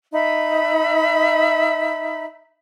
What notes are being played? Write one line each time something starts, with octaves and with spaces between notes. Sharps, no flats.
D#4 E5 B5